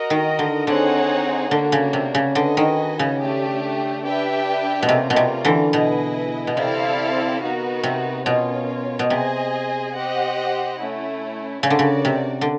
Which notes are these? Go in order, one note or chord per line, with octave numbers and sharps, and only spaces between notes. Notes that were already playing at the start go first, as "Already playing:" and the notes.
Already playing: F#4 A#4 D#5
D#3
D3
D3 C4 D#4 G#4 C#5 F#5
D3 A#3 D4 F#4
C#3
C3
C#3
D3 F#4 B4 D#5 G#5
D#3
C#3
A3 D4 G4
D4 G4 B4 E5 G5
B2
C3 A3 C#4 F4 A#4 D5
B2
C3
D3 E3
B2 E4 G#4 B4 D#5
B2
C3 C4 E4 A4 D5 F5
B3 D#4 F#4 A#4
C3
B2 C#4 F4 A#4 C#5
B2
C3 G#4 C5 D#5 G#5
G4 C5 D#5 F#5
A3 C#4 E4
C#3 D4 F#4 A#4 D5
D3
C#3
C3
D3